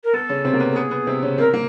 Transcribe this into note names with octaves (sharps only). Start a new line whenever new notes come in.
A#4
B3 A4
C#3 C#4
C3 C4
A#3
B3
A4
B3 G#4
B3
C3 C4
C#3 C#4
C3 C4 A#4
A#3